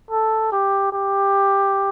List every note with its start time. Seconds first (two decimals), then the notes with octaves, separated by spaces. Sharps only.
0.11 A4
0.52 G4
0.93 G4